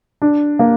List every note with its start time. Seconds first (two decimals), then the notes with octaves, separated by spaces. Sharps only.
0.22 D4
0.59 A#3